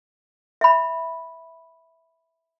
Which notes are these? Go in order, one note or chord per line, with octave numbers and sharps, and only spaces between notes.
E5 B5